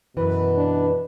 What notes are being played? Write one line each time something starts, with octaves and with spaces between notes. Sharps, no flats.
F#2 B2 E3 B4
D4